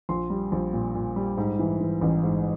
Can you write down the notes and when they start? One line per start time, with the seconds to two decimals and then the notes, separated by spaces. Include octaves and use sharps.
0.09 A#1 C6
0.30 G3
0.52 A#1
0.73 A#2
0.95 A#2
1.16 G3
1.37 G#2
1.59 E3
1.80 E3
2.01 A1
2.23 G#2